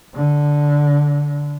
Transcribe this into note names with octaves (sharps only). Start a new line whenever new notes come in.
D3